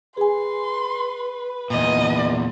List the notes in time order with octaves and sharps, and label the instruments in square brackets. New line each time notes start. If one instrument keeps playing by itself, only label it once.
[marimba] G#4 G#5 [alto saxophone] B4 [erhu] C6
[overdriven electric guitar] E2 A#2 [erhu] D#5